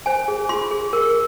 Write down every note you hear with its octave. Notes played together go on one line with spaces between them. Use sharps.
C5 G#5
G#4
F4 C6
G#4
A#4